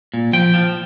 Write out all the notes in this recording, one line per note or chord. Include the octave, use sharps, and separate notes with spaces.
A#2
F3 G5
F3